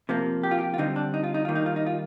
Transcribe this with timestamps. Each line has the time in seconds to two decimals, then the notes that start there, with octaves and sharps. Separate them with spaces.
0.09 C3 F3 A#3
0.43 G4
0.51 F4
0.59 G4
0.74 F4
0.78 D3 G3 C4 D#4
0.96 D4
1.14 D#4
1.24 F4
1.34 D#4
1.45 D#3 G3 A#3 F4
1.56 D#4
1.66 F4
1.76 D#4
1.86 F4